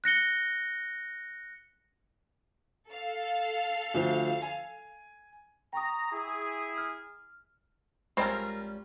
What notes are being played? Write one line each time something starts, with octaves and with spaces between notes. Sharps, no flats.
F#6 A#6 C#7 G7
A4 F5
D2 F3 C5
G#5
G5 A#5 C#6 D#6
E4 G#4
F6
A#1 G3 G#3 C4 C#4 F4 A#4